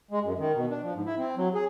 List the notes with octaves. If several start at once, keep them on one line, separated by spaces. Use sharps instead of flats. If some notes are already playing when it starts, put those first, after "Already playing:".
G#3
F#2
D#3
B2
D4
F3
G#2
E4
C4
F#3
G#4